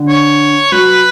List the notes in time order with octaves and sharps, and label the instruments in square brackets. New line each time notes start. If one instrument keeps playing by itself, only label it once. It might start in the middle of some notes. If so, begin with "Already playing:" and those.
Already playing: [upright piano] D3
[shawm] C#5
[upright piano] F#3 [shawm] B4